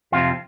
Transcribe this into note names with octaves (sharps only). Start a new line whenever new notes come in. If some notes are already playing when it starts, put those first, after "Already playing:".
F2 C3 F3 F4